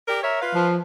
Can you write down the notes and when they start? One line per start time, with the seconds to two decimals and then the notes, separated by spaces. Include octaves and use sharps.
0.08 G4 A#4 D5
0.23 A#4 C#5 E5
0.41 F4 B4 F5
0.55 F3